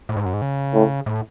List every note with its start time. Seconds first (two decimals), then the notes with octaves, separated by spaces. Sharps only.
0.09 A2
0.16 G#2
0.26 F#2
0.33 G#2
0.42 C#3
0.74 A2
1.06 A2